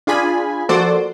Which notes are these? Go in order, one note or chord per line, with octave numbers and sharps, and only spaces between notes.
D4 F4 G#4 G#5 B5
F3 A#3 F#4 A4 C5 D5